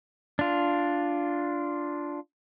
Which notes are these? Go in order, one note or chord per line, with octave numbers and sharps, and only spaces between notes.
D4 F4